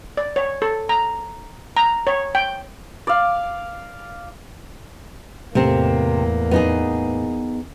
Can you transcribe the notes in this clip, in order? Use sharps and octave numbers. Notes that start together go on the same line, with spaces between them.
D5
C#5
A4
A#5
A#5
C#5
G5
D5 F5
E2 A2 C3 A3 A#3 C4
B3 D#4 G#4